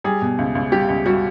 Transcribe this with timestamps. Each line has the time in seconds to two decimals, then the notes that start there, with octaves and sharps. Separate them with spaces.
0.04 G3 G#4
0.22 B2
0.38 C#2
0.55 C#2
0.72 G3 G4
0.88 C#2
1.06 G3 F#4